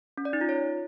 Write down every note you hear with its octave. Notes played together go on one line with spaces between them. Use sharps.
C#4
D5
D#4
F4
C#5